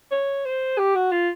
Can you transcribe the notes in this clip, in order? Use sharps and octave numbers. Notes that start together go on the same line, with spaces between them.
C#5
C5
G4
F#4
F4